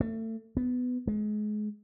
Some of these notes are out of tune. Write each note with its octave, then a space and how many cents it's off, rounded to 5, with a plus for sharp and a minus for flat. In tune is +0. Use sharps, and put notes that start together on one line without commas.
A3 +30
B3 +15
G#3 +30